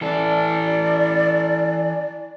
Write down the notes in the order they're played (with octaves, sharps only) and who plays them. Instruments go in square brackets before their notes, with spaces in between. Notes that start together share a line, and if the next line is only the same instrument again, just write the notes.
[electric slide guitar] E3 A4 [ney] D5